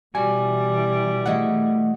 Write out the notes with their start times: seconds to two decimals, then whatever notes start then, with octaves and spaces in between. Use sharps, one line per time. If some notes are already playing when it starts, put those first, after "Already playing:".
0.15 B2 E3 G3 F#4 G#5
1.26 A3 E4 G#4 D#5 F#5